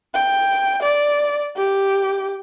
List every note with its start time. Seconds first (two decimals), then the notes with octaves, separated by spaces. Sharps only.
0.14 G5
0.82 D5
1.57 G4